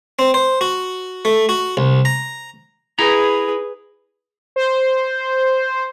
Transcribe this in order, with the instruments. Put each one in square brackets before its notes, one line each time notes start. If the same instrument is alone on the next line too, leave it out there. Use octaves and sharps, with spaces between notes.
[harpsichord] C4
C5
F#4
A3
F#4
C2
A#5
[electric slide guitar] E4 A#5 [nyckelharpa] G#4 B4
[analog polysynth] C5